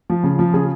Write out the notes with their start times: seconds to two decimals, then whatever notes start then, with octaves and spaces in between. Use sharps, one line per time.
0.10 F3
0.24 C#3
0.39 F3
0.53 C#3 G#4